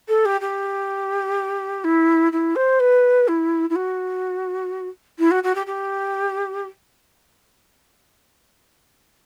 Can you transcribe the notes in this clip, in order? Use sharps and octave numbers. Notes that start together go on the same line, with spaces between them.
A4
G4
G4
E4
E4
C5
B4
E4
E4
F#4
E4
F#4
F#4
G4
G4